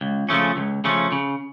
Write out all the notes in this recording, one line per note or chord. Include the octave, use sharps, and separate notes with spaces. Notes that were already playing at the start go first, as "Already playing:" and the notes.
C#2
C#3 F3 A3 C#4
C#2
C#3 F3 A3 C#4
C#3